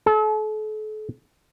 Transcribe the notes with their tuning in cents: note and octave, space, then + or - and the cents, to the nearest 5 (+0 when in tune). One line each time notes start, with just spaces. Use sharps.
A4 -40